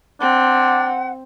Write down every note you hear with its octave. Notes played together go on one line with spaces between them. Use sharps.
C4 D4 F#5